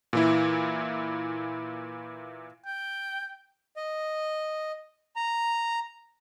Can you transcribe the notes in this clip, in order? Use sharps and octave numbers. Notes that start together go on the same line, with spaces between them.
A#2 E3 E4
G5
D#5
A#5